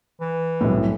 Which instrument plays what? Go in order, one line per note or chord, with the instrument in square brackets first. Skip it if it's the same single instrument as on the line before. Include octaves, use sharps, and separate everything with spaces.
[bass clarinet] E3
[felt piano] C2 F#2 A2